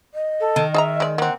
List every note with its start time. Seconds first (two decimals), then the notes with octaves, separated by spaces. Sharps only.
0.14 D#5
0.40 A4
0.56 D#3
0.74 G#4 E5 A5 A#5
1.00 G#3 D5
1.18 A#3 C4 F#5